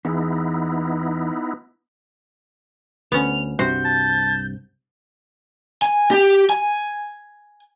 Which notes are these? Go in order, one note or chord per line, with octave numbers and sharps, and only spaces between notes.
E2 B3 D#4 E4
D2 B3 C#4 F7
C2 G2 C3 F#4 C5 G6
A5
G#5
G4
G#5